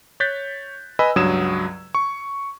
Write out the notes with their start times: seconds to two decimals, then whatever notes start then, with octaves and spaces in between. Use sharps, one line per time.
0.20 C#5 F#6 G6 A6 B6
0.99 B4 D#5 G#5 B5 E6
1.16 C#2 G2 F#3 D#6 G#6 E7
1.95 C#6